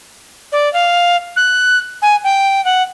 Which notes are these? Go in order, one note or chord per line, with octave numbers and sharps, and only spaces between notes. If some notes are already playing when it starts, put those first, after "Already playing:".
D5
F5
F#6
G#5
G5
F#5